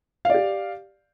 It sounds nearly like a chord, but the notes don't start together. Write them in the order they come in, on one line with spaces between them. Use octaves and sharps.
F5 D5 G4